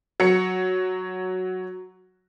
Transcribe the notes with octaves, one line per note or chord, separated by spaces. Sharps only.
F#3 C#7